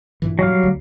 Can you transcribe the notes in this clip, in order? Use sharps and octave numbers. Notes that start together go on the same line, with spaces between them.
G2 A#2 E3
F#3 G3 F5
D2